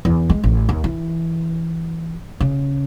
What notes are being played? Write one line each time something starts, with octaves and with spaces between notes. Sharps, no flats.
E2
G#3
A1
D#2
E3
C#3